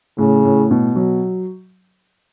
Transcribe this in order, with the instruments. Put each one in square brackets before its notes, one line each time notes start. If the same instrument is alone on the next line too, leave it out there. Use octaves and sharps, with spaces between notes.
[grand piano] A2 [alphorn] C#3
[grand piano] A2
B2
F#3